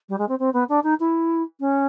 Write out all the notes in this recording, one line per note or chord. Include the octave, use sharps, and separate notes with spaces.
G3
G#3
C4
C4
B3
D4
D#4
E4
C#4